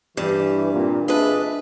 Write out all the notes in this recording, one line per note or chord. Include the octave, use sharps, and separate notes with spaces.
G2 E3 G4
A#2 C4
D4 F4 G#4 B4 D#5 E5